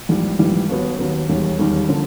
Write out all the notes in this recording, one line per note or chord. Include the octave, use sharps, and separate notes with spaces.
A#1 G#2 E3 G3
A#1 G#2 E3 G3
D#2 D#3 F#3 B3
D#2 D#3 F#3 B3
E1 D#2 D#3 G3
E1 D#2 D#3 G3
D3 F3 A#3